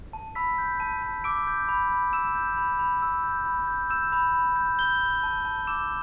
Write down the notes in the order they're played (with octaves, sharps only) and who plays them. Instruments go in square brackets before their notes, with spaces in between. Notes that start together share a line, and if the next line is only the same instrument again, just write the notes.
[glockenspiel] A5
B5 E6 B6
G6
A5
A5
D6 E6 D7
G6
B5
B5
E6 E7
G6
B5
B5
E6
G6
B5
G6
E6 G6 E7
B5
B5
G6
G6 G7
B5
A5
A5
D6 E6 E7